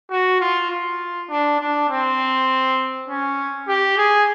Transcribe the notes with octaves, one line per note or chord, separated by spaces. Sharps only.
F#4
F4
F4
D4
D4
C4
C#4
G4
G#4